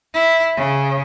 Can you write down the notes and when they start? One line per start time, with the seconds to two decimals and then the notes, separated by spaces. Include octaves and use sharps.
0.13 E4
0.56 C#3